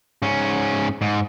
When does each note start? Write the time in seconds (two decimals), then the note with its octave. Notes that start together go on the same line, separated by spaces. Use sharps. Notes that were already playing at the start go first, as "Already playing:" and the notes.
0.22 G#2 C#4
1.01 G#2